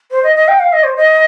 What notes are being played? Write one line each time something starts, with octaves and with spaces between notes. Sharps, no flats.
C5
D#5
D#5
G5
F5
D#5
C5
D#5